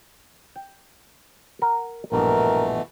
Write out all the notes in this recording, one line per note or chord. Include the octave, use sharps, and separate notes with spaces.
G5
A#4 F#5 A#5
A#1 G2 B2 E3 A3 A#4